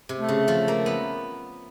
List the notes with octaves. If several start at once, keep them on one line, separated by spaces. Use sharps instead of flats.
C3
A3
C#3
F3
A#3
B3